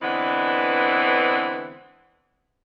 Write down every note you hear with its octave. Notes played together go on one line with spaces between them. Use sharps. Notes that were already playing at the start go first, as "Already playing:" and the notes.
D3 E3 G#3 B3 C4 D4